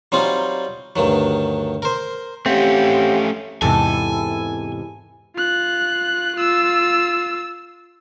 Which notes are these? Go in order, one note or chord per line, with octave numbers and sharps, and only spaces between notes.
F#3 G3 C4 D#4 F4
D2 G2 D#3 F#3
A#4 C5
A3 C4 C#4 G4 F5 F#5
E2 G#2 C3 E4 A4 G#5
F4 F#6
F4 E6